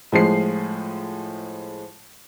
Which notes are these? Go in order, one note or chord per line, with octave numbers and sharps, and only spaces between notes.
A2 F3 G#3 C7